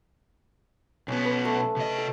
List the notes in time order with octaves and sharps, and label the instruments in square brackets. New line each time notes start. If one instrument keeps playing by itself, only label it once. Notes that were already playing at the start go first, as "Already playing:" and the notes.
[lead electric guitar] B1 B3 [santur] C#4
[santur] B4
A3
[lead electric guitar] C3 D#5
[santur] A4